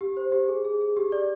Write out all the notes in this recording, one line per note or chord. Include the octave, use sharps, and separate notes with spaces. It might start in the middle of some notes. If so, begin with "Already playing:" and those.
G4
C5
G4
G#4
G#4
G#4
G4
D5